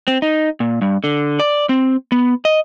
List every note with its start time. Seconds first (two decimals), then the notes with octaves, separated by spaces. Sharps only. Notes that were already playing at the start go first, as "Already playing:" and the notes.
0.08 C4
0.22 D#4
0.60 A#2
0.82 G2
1.04 D3
1.39 D5
1.69 C4
2.12 B3
2.45 D#5